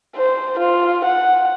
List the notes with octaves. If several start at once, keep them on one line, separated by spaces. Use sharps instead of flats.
C5
F4
F#5